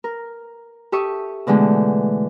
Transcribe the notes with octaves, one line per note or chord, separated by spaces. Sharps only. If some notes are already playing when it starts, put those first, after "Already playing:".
A#4
G4 A4 E5 C#6 D#6
B2 D3 E3 G#3 A3 A4